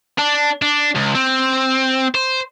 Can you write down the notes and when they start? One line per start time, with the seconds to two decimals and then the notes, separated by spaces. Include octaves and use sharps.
0.19 D4
0.62 D4
0.95 C#2
1.15 C4
2.15 C5